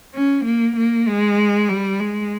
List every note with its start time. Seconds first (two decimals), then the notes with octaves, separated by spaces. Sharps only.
0.15 C#4
0.45 A#3
0.76 A#3
1.07 G#3
1.69 G3
2.00 G#3